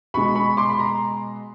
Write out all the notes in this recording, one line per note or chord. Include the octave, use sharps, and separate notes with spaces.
B2 G#3 B5 C#6
B5 C#6
C6 D6
B5
A#5 C6